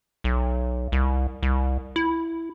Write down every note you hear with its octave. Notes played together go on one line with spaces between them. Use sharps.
B1
C2
C2
E4